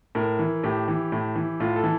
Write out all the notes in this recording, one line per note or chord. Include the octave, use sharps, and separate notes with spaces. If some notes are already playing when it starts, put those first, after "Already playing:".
A2 A#4
E3
A2 G4
E3
A2
E3
A2 F4
A4
E3